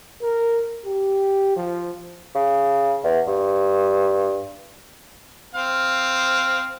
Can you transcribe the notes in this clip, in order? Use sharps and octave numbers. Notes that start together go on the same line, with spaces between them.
A#4
G4
F3
C#3
E2
G2
C4 F5